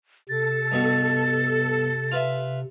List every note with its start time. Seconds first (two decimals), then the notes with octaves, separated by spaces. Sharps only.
0.29 C3 A4 A6
0.72 G2 B2
2.12 F4 B4 E5